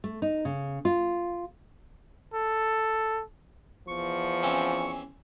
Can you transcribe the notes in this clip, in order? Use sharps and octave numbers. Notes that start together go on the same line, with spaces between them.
A3
D#4
C#3
F4
A4
E2 F3 C#6
E3 C4 C#4